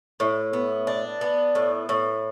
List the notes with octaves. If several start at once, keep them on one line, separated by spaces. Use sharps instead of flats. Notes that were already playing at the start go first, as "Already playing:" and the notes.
A2
B3
D4
B3
A2
A2